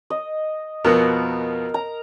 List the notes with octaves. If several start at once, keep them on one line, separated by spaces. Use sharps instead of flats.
D#5
F2 B2 B3 A#4
A#5